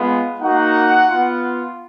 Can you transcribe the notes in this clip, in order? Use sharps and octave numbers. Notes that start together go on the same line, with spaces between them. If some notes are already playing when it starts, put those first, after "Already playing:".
Already playing: G#3 B3 F4
A#3 D#4 F#4 F#5
B3 F4